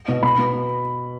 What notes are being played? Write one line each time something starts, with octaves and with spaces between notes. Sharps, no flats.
B2
B2 B5
B3